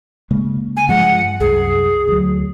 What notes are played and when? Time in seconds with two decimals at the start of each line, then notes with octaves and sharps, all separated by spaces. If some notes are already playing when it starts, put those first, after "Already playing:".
0.31 C#3 G#3 A#3
0.77 G#5
0.89 G2 F3 G#3 F#5
1.40 C2 F#2 G#4
2.08 D2 F#3